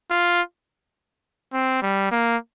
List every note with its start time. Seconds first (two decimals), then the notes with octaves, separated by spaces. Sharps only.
0.11 F4
1.53 C4
1.82 G3
2.11 A#3